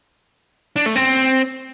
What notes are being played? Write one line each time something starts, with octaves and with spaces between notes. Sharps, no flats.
D4
A3
C4